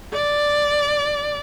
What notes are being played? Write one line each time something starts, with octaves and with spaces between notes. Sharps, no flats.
D5